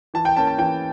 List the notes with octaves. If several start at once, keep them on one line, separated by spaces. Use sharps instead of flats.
E3 A5
G5
A#3 C#4 A5
A5
E3 G5